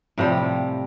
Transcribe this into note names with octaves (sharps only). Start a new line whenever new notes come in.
A2 C3 F3 G3